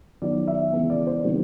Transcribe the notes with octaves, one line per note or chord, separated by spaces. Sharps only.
D#3 F#3 B3 D5
E5
C#3 E3 G#3 B3
D5
C5
C3 D#3 F#3 A#3